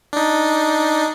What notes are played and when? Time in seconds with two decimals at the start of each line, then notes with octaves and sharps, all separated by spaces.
0.13 D4 D#4